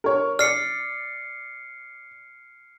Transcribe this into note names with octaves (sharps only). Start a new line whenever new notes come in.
A#4 C#5
D5 F6 C7 C#7